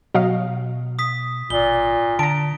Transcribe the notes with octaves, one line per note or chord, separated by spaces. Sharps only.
B2 F#3 D#5 F5
D#6 B6
G#1 A#2 G7
D3 A5 A#5 D7